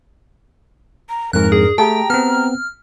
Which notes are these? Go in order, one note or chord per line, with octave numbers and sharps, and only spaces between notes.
A#5
F2 G#2 A#4 F#6
D4 G#4
A3 G4 G#4 G5 A5 A#5
B3 C4 F6